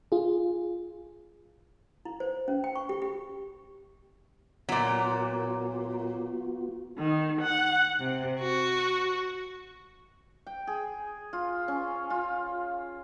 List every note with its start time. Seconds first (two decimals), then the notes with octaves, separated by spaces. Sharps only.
0.12 F4 G#4
2.05 E4
2.20 C5
2.48 C#4
2.64 G5
2.76 C#6
2.89 G4
3.02 G4
4.69 A#2 F#3 B3 F4 F#4
6.98 D#3
7.42 F#5
8.01 C3
8.40 F#4
10.47 G5
10.67 G#4
11.33 F4
11.68 C#4
12.10 F4